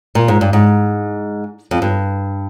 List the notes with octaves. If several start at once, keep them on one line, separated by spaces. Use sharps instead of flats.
A#2
G#2
G2
G#2
F2
G2